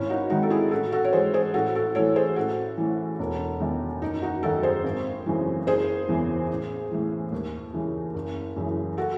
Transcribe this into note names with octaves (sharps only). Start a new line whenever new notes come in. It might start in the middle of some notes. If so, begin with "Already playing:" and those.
Already playing: G#1 C#4 E4
D#4 F#4
G#2 D#3 D#4 F#4
A4
E4 G#4
A1 F#4 A4
F#4 A4
C#5
G#2 E3 G#4 C5
G#4 C5
A1 F#4 A4
F#4 A4
A2 E3 A4 C#5
G#4 C5
A1 F#4 A4
A2 E3
E1
E2 D#3
F#1 D#4
D#4 F#4
F#2 D#3 F#4 A4
G#4 C5
G#1
F#2 C#3 E3
F#1 G#4 C5
E2 C#3 E3
A1
A2 E3
D#2
C#3 E3
F#1
F#2 C#3 E3
F#4 A4